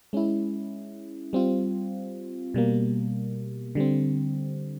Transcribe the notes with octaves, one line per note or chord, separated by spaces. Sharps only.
G#3 C#4 E4
G3 C4 F4
B2 G3 A#3
D3 G3 C4